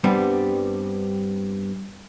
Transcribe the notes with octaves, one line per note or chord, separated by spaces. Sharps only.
G2 G3 B3 C4